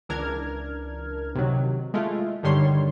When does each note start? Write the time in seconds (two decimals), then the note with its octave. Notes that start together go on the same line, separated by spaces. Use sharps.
0.09 C#2 E3 D4 A#4 F6 G#6
1.35 C3 D#3 F#3
1.94 G#3 A3 E4 F4
2.43 G2 D3 D#3 G3 C#5 C6